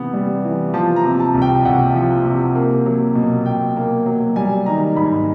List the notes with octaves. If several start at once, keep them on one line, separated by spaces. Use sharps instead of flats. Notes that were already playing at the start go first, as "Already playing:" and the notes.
Already playing: C3 E3 B3
G3
E3
F3 A5
A#5
C3
A5
C2
G5
C2 F#5
F3
C3
A#3
F#3
B2
B2 G5
A#3
F#3
G3 G#5
D#3 A#5
G#2 B5